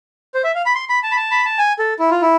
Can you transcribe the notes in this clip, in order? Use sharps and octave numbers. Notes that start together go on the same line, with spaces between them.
C5
E5
F5
B5
C6
B5
A5
B5
A5
B5
A5
G#5
A4
E4
F4
E4